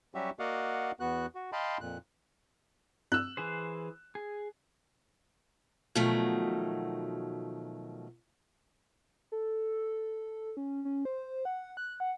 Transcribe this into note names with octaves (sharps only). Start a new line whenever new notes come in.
F#3 G3 C#4 F#4 G4 E5
A#3 F#4 D5 D#5 F5 F#5
E2 B3 F#4 F#6
F#4
D#5 F5 G5 A5 B5 C6
F2 A#2 F#6
E6 F#6
E3 G#4 C5
G#4
B2 D#3 F3 F#3 A3
A4
C#4
C#4
C5
F#5
F#6
F#5